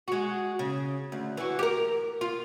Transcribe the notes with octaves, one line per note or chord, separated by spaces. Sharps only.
G#3 F#4
C#3
D2
E3 F#4
G4 A#4
F4